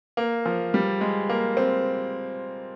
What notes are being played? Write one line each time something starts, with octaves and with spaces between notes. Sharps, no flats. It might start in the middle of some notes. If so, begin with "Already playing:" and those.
A#3
F3
G3
G#3
A#3
C4